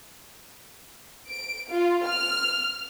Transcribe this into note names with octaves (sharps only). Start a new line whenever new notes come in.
D7
F4
F6